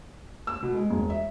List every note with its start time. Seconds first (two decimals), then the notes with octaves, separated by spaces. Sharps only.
0.47 E6
0.63 B2
0.75 G#3
0.90 E1
1.10 E5